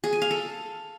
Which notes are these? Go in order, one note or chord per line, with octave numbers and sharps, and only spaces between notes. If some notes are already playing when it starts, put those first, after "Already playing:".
G#4
G#5
F5
A4